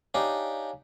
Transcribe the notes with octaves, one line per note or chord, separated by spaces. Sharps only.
D4 D#4 G4 C#5 F5 G#5